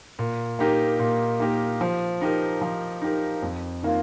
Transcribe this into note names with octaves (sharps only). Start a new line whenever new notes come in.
A#2
A#3 D#4 G4 A#4
A#2
A#3 D#4 G4 A#4
F3
D#4 G4 A#4
F3
D#4 G4 A#4
F2
D#3 A#3 F4